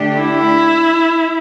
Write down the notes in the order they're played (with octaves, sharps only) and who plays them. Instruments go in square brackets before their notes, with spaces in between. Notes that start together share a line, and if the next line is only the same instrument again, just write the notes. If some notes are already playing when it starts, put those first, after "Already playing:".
Already playing: [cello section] D3 A3 D4 G4
[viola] E4